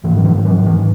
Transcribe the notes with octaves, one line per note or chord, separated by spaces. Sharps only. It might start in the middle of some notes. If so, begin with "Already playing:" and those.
G#2 E3
F#3
E3
F#3
E3